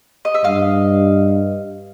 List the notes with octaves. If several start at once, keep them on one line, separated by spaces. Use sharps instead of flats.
D#5
E5
G2 D#5 F5